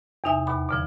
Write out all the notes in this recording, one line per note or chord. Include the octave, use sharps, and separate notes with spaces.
E2 C3 D#4 E5 G#5
D#2 B2 B5
B2 D3 F3